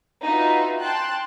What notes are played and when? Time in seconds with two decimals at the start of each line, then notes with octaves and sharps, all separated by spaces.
0.24 D#4 F4 F#4 B4 E5
0.79 G5 A5 C6 F#6